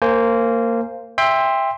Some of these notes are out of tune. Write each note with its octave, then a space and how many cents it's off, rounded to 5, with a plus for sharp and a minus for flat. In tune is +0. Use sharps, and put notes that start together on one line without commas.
A#3 -20 C5 +0 G#5 +0
E5 +0 G5 +25 C6 +0